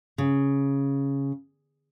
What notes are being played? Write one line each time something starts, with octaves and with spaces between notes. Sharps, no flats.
C#3